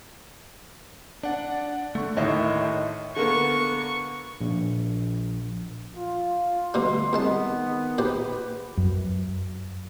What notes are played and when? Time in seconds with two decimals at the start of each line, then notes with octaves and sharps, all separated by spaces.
1.24 D4 D5 F#5
1.95 D3 A3 C#6
2.17 D#2 A2 D#3 C#5 D#5 E5
3.16 D3 A#3 B3 C#6
4.41 A#1
5.96 F4
6.74 D2 B2 G3 A3 G4 C6
7.13 C2 D#3 G#3 B3 A5
7.98 A#1 G4 B4 C5
8.77 F#2